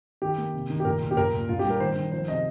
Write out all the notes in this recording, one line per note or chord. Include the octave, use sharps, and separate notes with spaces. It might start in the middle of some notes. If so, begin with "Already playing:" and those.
D#3 G4
A#3
C3
D#3
G4
A#2 A#4
A#2
G4
A#2 A#4
A#2
A#2 F4
G4
G3
A#4
D#3 C5
D#3
F3 C5
C3 D#5